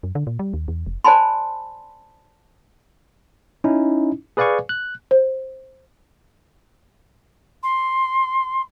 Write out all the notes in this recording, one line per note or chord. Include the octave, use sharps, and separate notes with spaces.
F#2
D3
A#2
G3
D#2
E2
F1
C5 D5 G#5 A5 B5 C6
C#4 D#4 E4
G#4 B4 D5 F5 G#5 C#6
F#6
C5
C6